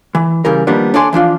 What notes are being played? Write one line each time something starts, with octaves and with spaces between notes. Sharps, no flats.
E3
C#3 E3 G3 A#4
D#3 F3 G3 A#3 B3 D4
D4 A4 C#5 D5 G#5 C6
E3 F3 D4 F4